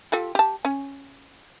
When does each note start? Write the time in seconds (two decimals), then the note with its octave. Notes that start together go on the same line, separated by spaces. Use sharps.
0.12 F4 G4 A4
0.35 G4 A5
0.65 C#4